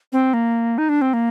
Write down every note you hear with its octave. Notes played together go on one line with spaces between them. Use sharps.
C4
A#3
D#4
D4
C4
A#3